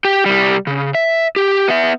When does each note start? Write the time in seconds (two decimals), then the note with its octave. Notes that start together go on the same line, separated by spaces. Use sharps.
0.05 G4 G5
0.26 C2 G3
0.67 C#3
0.95 E5
1.36 G4
1.68 B3 E5